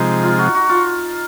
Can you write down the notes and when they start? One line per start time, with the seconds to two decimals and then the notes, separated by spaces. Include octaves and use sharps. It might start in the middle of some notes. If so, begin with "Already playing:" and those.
Already playing: C3 F3 G#3 D#4
0.23 F4
0.39 F#4
0.55 F#4
0.69 F4